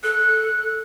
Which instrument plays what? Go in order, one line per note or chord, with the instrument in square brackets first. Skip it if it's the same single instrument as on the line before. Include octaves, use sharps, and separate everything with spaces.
[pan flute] A4 [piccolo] F#6